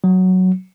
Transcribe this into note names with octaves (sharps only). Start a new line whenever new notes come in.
F#3